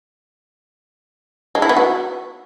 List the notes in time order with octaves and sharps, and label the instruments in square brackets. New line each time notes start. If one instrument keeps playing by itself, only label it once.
[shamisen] G#3
E4
B3
F#4